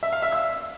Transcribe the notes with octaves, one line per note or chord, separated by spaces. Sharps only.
E5
F5
E5
E6